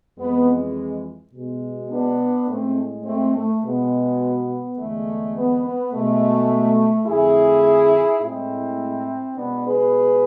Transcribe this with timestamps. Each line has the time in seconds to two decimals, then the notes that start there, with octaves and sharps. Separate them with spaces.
0.17 F2 E3 G#3 B3
1.33 B2 G#3
1.89 B3 D4
2.48 A2 G#3 A3 C4
3.04 A3 C4
3.34 A3
3.62 B2 G#3 B3
4.77 E2 D3 G#3 A3
5.35 B3
5.63 B3
5.92 B2 G#3 A3
7.07 F2 D3 F3 A3 E4 G#4
8.21 A2 G#3 C4 E4
9.36 B2 G#3 B3 D4
9.65 G#4 B4